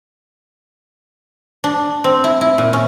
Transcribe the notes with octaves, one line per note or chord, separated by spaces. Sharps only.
D4
C4
E4
E4
A#2
C#4